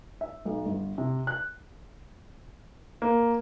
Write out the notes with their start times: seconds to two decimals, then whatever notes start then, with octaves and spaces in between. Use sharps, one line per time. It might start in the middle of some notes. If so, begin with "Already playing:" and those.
0.21 E5
0.45 B1
0.66 G1
0.98 C3
1.27 F#6
3.02 A#3